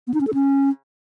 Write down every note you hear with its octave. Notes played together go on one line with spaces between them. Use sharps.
B3
D#4
C#4
A4
C#4